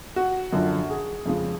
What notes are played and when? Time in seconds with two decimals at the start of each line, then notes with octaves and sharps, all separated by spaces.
0.16 F#4
0.53 F#2 D3 F3
0.90 G#4
1.26 F2 C#3 G#3